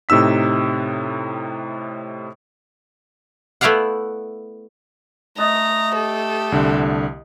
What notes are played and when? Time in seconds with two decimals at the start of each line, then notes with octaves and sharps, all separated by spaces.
0.09 A2 C3 D#4 E6 B6
3.61 A3 B3 E4 D5 F5 F#5
5.38 A3 D#5 A5 A#5
5.94 G4 A4
6.52 C2 D3